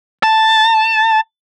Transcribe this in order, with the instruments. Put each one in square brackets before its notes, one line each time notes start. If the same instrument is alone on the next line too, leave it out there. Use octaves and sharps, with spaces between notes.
[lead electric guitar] A5